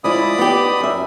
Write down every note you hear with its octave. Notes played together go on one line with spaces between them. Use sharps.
F3 G#3 E4 D5 B5 D#6
B3 D#4 G4
F#2 E5